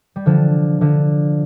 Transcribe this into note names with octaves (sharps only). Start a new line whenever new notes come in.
G3
D3 F3
D3 F3